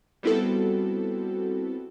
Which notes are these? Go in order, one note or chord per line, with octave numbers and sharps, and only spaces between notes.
G3 B3 C4 E4 F#4 A4